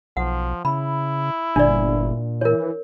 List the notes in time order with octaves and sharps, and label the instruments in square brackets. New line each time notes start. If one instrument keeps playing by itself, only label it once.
[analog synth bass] B1 [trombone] F3 [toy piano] F#5
[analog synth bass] C#3 [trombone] E4 [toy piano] B5
[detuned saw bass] G1 [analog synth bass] A#2 [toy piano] D4 D5
[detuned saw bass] E3 [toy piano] A#4 C#5